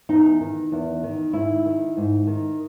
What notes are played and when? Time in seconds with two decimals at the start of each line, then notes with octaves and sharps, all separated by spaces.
0.09 E2 D#4
0.41 D#3
0.72 E2
1.03 D#3
1.33 G#2 E4
1.66 D#3
1.97 G#2
2.27 D#3